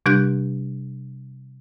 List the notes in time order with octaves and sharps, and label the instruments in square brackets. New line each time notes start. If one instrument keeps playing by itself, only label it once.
[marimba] C3 G3 D4 G4 F#6 G6